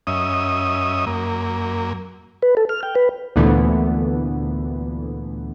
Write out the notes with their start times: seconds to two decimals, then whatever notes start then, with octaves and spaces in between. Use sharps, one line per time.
0.07 F#2 C#4 D#5 E5 D#6
1.07 F#2 A#3
2.42 B4
2.57 A4
2.69 F6
2.83 G5
2.95 B4
3.36 D2 A#2 D3 E3 A3 B3